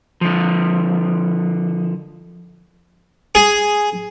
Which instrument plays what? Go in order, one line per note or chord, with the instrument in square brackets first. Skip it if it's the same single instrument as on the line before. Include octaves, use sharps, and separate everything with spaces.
[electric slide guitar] D3 F3
[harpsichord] G#4